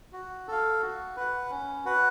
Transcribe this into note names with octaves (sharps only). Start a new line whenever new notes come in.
F#4
A4 F5
F#4
B4 F#5
C#4
F#4 B4 F#5